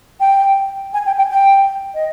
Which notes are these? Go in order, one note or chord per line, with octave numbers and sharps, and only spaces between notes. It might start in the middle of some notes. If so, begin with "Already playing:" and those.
G5
G#5
G5
G5
G5
D#5